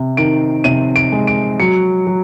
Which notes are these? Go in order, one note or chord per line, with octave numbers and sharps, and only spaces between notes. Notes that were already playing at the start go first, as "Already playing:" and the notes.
Already playing: C3
D#3 D7
C3 D#7
D7
G#3
D7
F#3 C#7
F#3